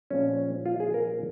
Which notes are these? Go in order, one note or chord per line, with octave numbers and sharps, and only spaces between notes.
A#2 F3 G#3 C4 C#4
F4
G#4
A#4